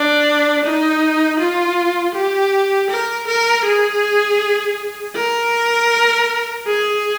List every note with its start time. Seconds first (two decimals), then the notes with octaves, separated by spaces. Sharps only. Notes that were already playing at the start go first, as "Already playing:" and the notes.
Already playing: D4
0.64 D#4
1.39 F4
2.15 G4
2.90 A#4
3.27 A#4
3.65 G#4
5.15 A#4
6.66 G#4